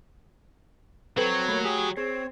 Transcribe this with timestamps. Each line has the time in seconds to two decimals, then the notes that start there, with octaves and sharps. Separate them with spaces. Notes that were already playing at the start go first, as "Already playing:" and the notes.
1.17 F#3 C4 A4 B4 C#5 G5
1.48 D#2 A3 A#3 B5
1.64 G4 G#4
1.97 C4 G#4 C#5